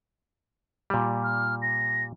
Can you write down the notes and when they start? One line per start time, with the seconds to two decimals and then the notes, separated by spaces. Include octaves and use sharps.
0.90 A#2 G3
1.23 F6
1.62 A#6